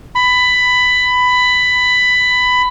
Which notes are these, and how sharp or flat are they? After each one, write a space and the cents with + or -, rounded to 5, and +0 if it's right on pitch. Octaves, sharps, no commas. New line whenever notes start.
B5 +15